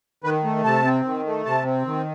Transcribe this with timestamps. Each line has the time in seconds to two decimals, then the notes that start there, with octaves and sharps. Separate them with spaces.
0.24 D#3 B4
0.44 A3
0.64 C3 A5
0.84 C4
1.05 D#3
1.26 A3
1.45 C3 A5
1.65 C4
1.86 D#3